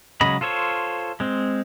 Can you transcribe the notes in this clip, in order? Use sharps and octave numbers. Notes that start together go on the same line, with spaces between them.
C#3 F#3 G#3 D#5 B5
F4 A4 C5 C#5
G#3 C4